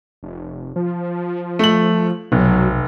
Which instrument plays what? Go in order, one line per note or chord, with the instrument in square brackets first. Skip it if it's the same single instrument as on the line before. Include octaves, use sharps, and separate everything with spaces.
[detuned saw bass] F1
F3
[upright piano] A3 F#7
[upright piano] F1 [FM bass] B1 [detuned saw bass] F#3